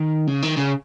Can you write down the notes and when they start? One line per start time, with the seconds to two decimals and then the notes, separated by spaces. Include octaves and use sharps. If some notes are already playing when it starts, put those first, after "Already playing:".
Already playing: D#3
0.27 C#3
0.42 D#3
0.57 C#3